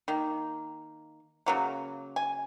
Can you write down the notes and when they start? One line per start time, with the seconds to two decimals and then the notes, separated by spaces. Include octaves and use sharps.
0.08 D#3 A#3
1.46 C#3 F#3 A#3
2.16 G#5